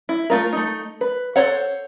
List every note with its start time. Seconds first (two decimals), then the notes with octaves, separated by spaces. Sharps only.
0.09 E4
0.30 A3 F4 A#4
0.53 A3 D#4
1.01 B4
1.36 A4 C5 C#5 F#5